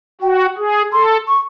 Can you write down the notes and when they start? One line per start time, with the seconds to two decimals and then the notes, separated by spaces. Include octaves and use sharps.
0.21 F#4 G5
0.58 G#4
0.92 A4 C6
1.28 C#6